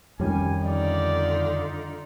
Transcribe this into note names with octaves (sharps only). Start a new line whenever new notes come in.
F2 D#3 G3 C#4 G#5
D3 D#4 F4 D5